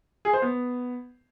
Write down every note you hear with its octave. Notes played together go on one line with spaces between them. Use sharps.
G#4
C5
B3